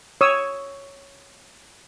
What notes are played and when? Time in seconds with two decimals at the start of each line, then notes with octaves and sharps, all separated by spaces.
0.21 C#5 D#6 E6